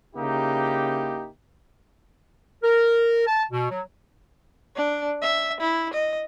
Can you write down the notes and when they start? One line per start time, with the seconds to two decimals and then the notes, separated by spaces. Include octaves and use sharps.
0.16 C#3 A#3 D#4 E4 G4
2.64 A#4
3.27 A5
3.51 B2
3.70 F#3
4.76 D4
5.22 E5
5.61 E4
5.94 D#5